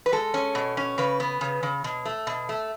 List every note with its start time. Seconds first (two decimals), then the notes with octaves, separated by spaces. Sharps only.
0.06 B4
0.12 G#3 A4
0.34 C#4
0.55 B2
0.77 C#4
0.98 C#3 B4
1.20 B3
1.41 C#3
1.63 C#3
1.84 B2
2.05 A3
2.27 B2
2.49 A3